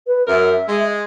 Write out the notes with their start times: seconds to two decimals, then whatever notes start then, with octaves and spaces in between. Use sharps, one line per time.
0.07 B4
0.27 F#2 A#4 E5
0.69 G#3